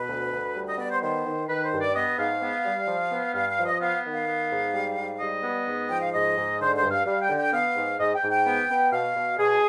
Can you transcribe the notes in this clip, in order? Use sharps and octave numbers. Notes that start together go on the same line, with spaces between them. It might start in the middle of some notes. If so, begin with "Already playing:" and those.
Already playing: B2 B4
D2
D2
G3
D#5
B3 D5
C5
D#3 C5
D#3
D#3 B4
C5
G2
D5
B3 D#5
G#2 F5
B3
G3
F3
B3
G2 F5
F5
F3
D#5
B3 F5
D#3
F5
B3
G#2
G3
G#2
G3 D#5
B3
G#2
F3 G5
F5
G#2 D#5
G#2
D3 C5
C5
G2
F5
G3 F5
G5
D3
G5
B3 F5
G#2
G#2 D#5
G5
G#2
G5
B3
B3
B2 F5
B2
B2 G#4